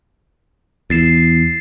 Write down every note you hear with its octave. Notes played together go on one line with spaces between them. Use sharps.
E2 A6 C7 E7